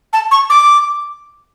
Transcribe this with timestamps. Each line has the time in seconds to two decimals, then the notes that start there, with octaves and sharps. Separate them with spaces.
0.13 A5
0.31 C#6
0.50 D6